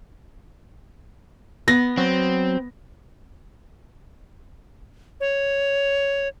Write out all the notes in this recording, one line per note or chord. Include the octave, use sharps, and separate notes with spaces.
B3 A#6
F#3 C4
C#5